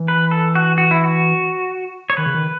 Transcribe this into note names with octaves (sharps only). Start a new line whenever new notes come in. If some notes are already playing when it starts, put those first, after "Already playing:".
Already playing: E3
B4
A4
F#4
F#4
E4
F#4
C#5
D#3 B4
C#3
D#3